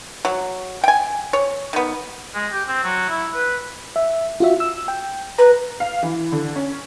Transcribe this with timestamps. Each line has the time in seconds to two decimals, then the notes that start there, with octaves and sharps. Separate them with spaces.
0.25 F#3
0.84 G5 G#5
1.33 C#5
1.73 D#3 B3
2.34 G#3
2.53 G4
2.68 C4
2.84 F#3
3.09 E4
3.34 B4
3.96 E5
4.40 F4 F#4 E5
4.60 E6
4.88 G5
5.38 B4 A#5
5.80 F5
6.03 E3
6.32 D3
6.56 C#4